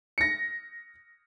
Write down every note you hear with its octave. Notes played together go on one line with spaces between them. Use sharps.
A#6 C#7